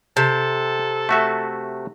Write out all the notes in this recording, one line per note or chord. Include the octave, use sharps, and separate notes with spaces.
C3 A4 A5
A3 F#4 E5